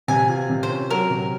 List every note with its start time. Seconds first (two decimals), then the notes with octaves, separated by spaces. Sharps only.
0.08 C3 G#5
0.29 F4
0.50 C3
0.63 C5
0.69 C#4
0.90 F#3 A#4
1.10 C3